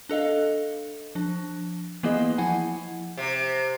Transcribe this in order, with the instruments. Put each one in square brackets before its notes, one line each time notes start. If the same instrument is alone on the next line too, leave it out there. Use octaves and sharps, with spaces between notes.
[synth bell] D4 A4 D#5 F5
F3 D4
E3 A#3 B3 E4 G#4 D#5
F3 E4 F#5 G#5
[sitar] C3